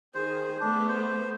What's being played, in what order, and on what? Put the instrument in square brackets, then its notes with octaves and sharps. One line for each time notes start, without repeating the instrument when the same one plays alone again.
[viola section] D#3 G#4 [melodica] C5
[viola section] A3 B3 [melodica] D4
[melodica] C5